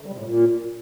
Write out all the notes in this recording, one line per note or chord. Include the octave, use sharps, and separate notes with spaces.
D3
G3
C3
A2
A#2